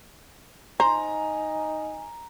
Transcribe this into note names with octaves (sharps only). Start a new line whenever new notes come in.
D#4 C5 G#5 A#5